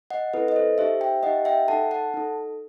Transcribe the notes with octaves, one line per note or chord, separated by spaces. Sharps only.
D#5 F#5
C4 E4 A4 B4
D#5
A4 C5
D#4 G4 C5 E5
E5 G5
D#4 G4 D#5 F#5
E5 G5
D#4 A4 F#5 A5
F#5 A5
D#4 A4